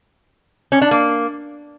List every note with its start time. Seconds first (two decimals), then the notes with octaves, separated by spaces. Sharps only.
0.72 C#4
0.82 D4
0.91 A#3